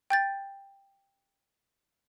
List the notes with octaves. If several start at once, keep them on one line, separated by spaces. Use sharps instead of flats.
G5 G6 A6